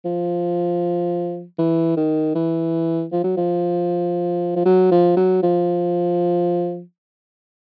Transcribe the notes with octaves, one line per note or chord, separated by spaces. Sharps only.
F3
E3
D#3
E3
F3
F#3
F3
F3
F#3
F3
F#3
F3